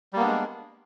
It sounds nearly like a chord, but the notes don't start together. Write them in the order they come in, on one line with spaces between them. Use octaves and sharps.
G3 A#3 B3 D4 G#3